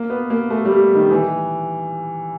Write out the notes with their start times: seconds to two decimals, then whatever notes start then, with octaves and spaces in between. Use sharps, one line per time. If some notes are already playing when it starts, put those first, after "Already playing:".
Already playing: A#3
0.10 B3
0.30 A#3
0.50 A3
0.65 G3
0.95 D#3
1.11 E3